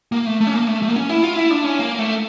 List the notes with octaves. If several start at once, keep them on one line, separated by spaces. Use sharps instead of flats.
A#3
A3
A3
C#4
A#3
A3
A3
A#3
C#4
E4
F4
E4
D4
C#4
A#3
A3